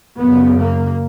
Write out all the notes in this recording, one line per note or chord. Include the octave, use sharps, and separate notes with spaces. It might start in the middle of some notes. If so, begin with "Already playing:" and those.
F#2 C#3 B3
A#3